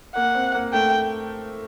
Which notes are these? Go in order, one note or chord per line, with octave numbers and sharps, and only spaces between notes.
A#3 F#5
C4
A#3
A3 G5